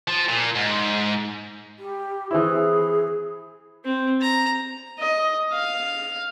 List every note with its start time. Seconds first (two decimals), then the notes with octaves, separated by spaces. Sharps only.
0.08 F3
0.28 A#2
0.55 G#2
1.79 G4
2.31 E3 C4 E4 G#4
3.84 C4
4.21 A#5
4.99 D#5
5.53 F5